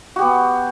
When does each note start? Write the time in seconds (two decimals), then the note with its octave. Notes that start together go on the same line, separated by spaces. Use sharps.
0.16 F#4
0.19 G4
0.21 B3